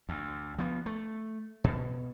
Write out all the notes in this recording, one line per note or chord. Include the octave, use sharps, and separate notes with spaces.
D2
F3 B3
A3
B2